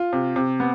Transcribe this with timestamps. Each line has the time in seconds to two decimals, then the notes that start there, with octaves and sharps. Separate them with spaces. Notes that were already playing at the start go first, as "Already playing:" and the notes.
Already playing: F4
0.13 C3
0.36 C3
0.60 B3